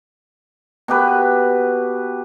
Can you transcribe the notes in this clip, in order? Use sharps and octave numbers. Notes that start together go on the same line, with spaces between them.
B2 G4 B4